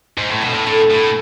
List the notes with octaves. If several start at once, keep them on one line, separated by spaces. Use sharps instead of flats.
G#2
A2
B2 D4 F4
A2 B3 D4
A2 A3 C4
B3
A2 B3